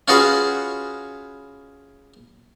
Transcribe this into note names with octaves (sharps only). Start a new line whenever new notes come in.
C#4 F4 F#4 G#4 B4